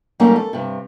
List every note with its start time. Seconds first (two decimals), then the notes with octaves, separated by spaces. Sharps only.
0.20 F#3 G3 A3 A#3 C#4 D#4
0.36 A4
0.53 G2 C3